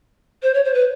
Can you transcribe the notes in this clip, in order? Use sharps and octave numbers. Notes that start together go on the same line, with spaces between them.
C5
C#5
C5
B4